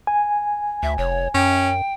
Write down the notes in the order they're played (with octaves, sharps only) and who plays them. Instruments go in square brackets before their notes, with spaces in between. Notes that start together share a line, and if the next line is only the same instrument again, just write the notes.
[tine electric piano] G#5
[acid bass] D2 [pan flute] E5
[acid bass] F1 [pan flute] C#5
[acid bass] F#2 [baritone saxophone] C#4 [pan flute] G5